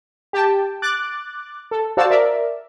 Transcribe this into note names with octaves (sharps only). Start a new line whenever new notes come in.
G4 G5 A5
D6 F#6 A6
A4
F#4 C5 D5 F5 A5 E6
A#4 D5 E5